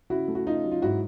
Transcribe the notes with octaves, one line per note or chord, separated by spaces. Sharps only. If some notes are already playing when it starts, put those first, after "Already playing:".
C#3 E4 F#4
A3
F#4
C#3 D#4 F4
F#3
F4
G#2 E4 F#4